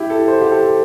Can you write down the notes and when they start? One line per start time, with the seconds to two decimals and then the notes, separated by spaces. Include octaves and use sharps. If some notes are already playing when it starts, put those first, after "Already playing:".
Already playing: E4 G4
0.10 A4
0.28 C5
0.41 G4
0.52 A4